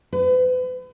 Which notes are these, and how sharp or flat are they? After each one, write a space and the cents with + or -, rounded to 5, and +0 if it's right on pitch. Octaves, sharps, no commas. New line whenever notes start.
B4 +40